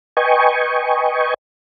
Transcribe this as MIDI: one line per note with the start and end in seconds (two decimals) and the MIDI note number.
0.17 1.34 71
0.17 1.34 75
0.17 1.34 79
0.17 1.34 80
0.17 1.34 85